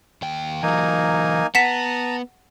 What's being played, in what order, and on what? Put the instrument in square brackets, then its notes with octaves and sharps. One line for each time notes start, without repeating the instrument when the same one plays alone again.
[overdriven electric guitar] D#2 G5
[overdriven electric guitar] E3 F#3 [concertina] A#3 D#4 G#5
[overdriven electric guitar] B3 [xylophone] F#5 B6 E7 [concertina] A5 A#5